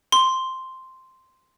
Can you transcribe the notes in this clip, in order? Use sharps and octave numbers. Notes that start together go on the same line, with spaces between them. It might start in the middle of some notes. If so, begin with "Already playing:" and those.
C6